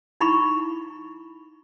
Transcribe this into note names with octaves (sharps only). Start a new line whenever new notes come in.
D#4 E4 A#5 B5 C#6